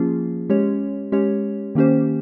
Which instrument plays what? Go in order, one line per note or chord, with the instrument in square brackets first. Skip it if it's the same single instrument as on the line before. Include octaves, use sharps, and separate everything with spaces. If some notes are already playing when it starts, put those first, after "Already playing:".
Already playing: [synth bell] F3 A#3 C#4 F4 G#4
G#3 C#4 G4 C#5
G#3 C#4 G4 C#5
D#3 A#3 C#4 G4 C5